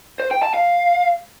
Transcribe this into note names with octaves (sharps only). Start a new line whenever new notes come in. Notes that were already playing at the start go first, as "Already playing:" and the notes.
C5
G5
A5
F5